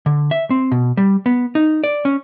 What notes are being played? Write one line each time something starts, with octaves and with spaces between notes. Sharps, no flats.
D3
E5
C4
B2
G3
B3
D#4
D5
C#4